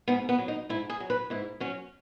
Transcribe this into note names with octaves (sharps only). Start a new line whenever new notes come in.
G#2 B3
B3
F#3
D#4
G#2 E4
G#4
F#3
B4
G#2 E4
F#3 C#4